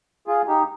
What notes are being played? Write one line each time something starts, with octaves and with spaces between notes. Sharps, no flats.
F4 G#4
D#4 G4